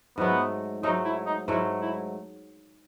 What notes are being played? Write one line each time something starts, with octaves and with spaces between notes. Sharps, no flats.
G#2 F#3 A3 B3
G#2 F#3 A3 D#4
E4
D#4
G#2 F#3 A3 E4
E4